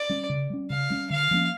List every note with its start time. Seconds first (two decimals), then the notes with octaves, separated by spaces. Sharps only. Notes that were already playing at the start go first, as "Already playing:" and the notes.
Already playing: D5
0.09 G3 C#4
0.30 C#3
0.50 G3 C#4
0.70 C#3 F5
0.90 G3 C#4
1.10 D3 F5
1.31 F3 A#3 C#4